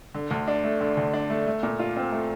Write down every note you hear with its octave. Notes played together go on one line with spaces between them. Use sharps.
D3
D2
D4
A3
D3
D2
D4
A3
A3
A#2
F4
C4
A3